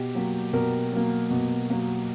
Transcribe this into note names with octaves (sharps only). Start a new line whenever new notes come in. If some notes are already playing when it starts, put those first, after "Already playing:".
Already playing: B2 G4
F#3 A#3
B2 A#4
F#3 A#3
B2
F#3 A#3